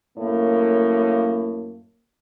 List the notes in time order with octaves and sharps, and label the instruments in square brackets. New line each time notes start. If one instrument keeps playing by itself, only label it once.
[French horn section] F#2 A2 A#3